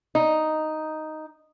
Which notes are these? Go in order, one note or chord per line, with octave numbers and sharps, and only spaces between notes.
D#4